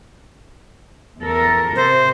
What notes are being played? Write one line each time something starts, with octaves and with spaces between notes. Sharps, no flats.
E2 A4 A#4
C3 C5